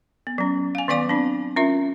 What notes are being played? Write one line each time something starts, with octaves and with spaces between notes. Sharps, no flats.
B3
F#3 C#4
F5 G#5
D#3 F#3 B3 D5 F5 D6
C4 D4
C#4 F4 A#4 E5